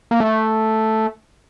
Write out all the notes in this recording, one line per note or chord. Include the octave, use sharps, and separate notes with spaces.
A#3
A3